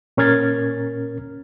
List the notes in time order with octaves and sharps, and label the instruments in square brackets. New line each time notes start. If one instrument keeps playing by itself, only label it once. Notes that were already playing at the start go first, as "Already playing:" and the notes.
[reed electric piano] A#2 C#4 A#4 F6 G#6 A6